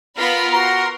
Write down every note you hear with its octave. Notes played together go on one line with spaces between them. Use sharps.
B3 F4 A#4 B5
F#4 A#5 C6